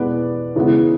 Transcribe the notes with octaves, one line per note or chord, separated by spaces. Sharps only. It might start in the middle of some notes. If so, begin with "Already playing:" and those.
Already playing: E2 B2 G#3 B3 B4 D5
E2 C#3 E3 G#3 B3